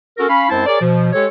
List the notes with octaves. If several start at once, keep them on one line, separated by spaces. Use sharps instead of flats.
C#4 F#4 A4 A#4
C#4 F5 B5
F#2 G#3 C4 E4 C5 A5
G#4 A#4 C#5 D5
B2 F3
G#3 G4 A4 C#5